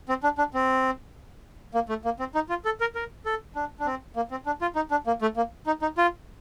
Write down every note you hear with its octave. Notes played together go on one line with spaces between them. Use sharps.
C4
D4
D4
C4
A#3
A3
A#3
C4
D#4
F4
A4
A#4
A#4
A4
D4
D4
C4
A#3
C4
D4
F4
D#4
D4
A#3
A3
A#3
D#4
D#4
F4